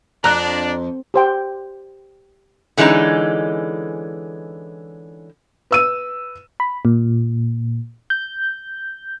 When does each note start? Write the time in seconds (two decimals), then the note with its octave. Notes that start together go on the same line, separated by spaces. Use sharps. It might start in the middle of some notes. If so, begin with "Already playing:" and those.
0.24 F2 D4 A#5 F#6
1.14 G4 C5 G5
2.77 D3 E3 G#3 C#4 D#4
5.71 B4 E6 D#7
6.60 B5
6.85 A#2
8.10 G6